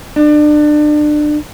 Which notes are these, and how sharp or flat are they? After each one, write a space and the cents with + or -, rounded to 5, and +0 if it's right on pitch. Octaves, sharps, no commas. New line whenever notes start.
D4 +30